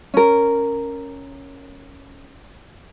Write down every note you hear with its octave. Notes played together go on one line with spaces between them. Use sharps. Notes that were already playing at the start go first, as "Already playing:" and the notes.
C#4 A#4